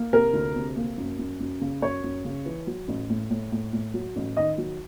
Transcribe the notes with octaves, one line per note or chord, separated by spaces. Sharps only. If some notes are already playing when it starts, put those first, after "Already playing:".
Already playing: A#3
C3 A#4
D2
C3
A#3
F#2
F#2
F#2
C#3
F#2 C#5
F#2
C#3
E3
F#3
A1
A2
A2
A2
A2
F#3
A1
D#3 D#5
F#3